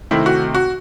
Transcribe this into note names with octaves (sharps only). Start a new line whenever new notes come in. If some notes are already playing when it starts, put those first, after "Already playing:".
C3 D#3 A3 C4 E4
F#4
F#4